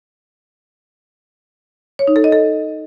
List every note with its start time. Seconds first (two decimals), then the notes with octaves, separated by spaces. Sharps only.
1.99 C#5
2.07 D#4
2.16 A4
2.24 D#5
2.32 A4